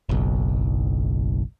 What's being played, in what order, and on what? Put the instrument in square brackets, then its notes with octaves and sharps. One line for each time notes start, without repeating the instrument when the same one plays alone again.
[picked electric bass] F#1 B1